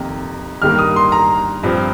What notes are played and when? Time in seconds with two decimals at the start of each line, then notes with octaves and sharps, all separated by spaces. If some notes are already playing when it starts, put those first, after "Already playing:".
Already playing: F2 C3 D#3 G3 A#3
0.62 G2 D#3 G3 A#3 F6
0.79 D#6
0.96 C6
1.12 A#5
1.63 G2 F3 C4